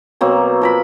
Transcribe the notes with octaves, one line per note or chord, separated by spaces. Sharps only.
B2 F#3 A#3 C4
F3 A#4 B5